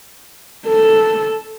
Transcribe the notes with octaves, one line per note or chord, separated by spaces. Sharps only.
A4